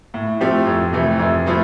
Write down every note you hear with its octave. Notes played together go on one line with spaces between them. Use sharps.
A2
F3 A3 C4 G4
F2
C3 E3 A3
F2
F3 A3 E4